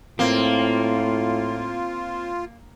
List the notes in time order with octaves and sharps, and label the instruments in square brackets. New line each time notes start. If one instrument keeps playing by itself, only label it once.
[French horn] A2 [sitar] A#3 [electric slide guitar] C4 [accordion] F4